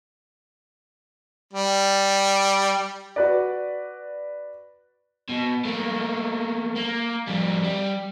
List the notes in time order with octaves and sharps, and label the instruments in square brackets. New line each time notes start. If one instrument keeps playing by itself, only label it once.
[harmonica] G3
[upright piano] F#4 B4 D5
[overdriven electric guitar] B2
A3 A#3
A#3
F2 G3
G3